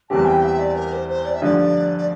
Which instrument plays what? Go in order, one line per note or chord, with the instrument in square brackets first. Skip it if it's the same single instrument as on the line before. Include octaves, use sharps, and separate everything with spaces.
[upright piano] E2 E3 G3 C4 G4 [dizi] A5
[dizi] G5
E5
D5
A#4
C5
C5
D5
E5
[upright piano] G2 D3 F3 [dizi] D5
[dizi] D5